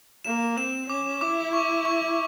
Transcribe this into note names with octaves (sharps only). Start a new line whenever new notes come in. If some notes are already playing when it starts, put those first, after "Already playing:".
A#3 E7
C4 E7
C#4 D6
E4 D6
C#6
C#6